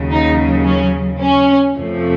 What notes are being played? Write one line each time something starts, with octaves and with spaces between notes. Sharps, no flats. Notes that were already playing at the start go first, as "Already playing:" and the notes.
Already playing: D#2 C#3 F#3
D#4
C#4
C#4
F2 C3 F3 A3